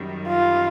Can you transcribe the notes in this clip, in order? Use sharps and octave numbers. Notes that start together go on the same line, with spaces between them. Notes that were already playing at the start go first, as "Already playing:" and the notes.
Already playing: F#2 D#3 G3
F4